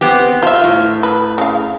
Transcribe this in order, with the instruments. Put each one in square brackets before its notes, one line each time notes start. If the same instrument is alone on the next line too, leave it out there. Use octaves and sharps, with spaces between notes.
[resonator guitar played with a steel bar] B3 C4 G4
[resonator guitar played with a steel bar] F4 [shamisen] C5 E5
[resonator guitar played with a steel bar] A2
[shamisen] B4
C#3 F5